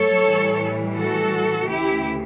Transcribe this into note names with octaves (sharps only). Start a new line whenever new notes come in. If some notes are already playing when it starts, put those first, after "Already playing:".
Already playing: G2 F#3 A3 A4 C#5
A2 E3 G3
F#4 A4
D2 C#3 E3 A3 E4 G4